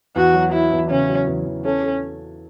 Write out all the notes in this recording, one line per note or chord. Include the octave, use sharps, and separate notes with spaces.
E2 F#4
F#3
F#3 E4
E2
C#3 C#4
F#3
E2
E2
C#4 A4
A4